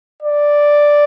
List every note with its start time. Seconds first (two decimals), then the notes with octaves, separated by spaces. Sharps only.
0.21 D5